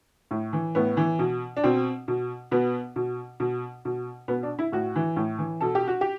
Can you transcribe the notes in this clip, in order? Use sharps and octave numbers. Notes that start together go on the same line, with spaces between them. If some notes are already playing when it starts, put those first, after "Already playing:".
A2
E3
A2 B3
E3
B2
D4
B2 C4
B2
B2 B3
B2
B2
B2
B2 B3
D4
E4
A2 F#4
E3
A2
E3
B2 A4
G4
F#4
G4